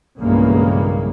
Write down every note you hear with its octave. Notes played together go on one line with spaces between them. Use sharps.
B1 G2 C#3 E3 G#3 A#3